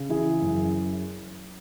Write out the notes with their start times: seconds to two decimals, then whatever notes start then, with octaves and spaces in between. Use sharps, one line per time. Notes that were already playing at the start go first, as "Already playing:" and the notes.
Already playing: C#3
0.09 E3 E4 G#4
0.42 F#2